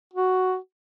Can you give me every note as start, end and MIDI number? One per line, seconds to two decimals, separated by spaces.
0.14 0.57 66